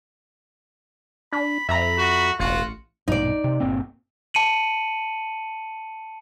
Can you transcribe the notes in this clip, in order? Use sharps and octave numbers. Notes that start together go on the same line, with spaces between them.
D4 B5
F2 E5 A#5 B5
F#4
E1 A1 F4 F#4 C#7
A#1 G2 B2 D#4 D5
C3
G1 A#2 C4
A5 C#7 D#7 F#7